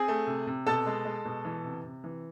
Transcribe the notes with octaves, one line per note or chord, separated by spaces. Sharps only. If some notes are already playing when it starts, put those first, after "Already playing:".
Already playing: C4 G#4 G#5
A3
C3
C3
B2 A4 A5
G#3
G#3
B2
E3
C3
C3
E3